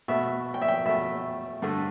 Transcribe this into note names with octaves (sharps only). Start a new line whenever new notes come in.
B2 A3 E5
G5
E5
G5
B2 A3 E5
G2 D3 A3